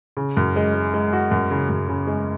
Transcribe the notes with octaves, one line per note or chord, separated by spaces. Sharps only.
C#3
F#2
G#3
G#3
G#3
F#4
F#2
C#3
F#2
C#3
G#3